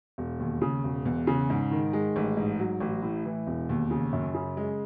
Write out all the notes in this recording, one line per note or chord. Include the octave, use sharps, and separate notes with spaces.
E1
D#2
C#3
E1
E2
C#3
G#2
D#3
G#3
A1
G#2
F#3
A1
A2
E3
E1
D#2
C#3
F#2
C#3
G#3